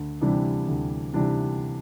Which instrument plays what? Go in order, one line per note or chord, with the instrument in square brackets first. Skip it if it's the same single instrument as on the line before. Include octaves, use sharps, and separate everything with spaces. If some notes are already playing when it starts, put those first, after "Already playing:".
Already playing: [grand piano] D2
C3 E3 G3 D4
D2
C3 E3 G3 D4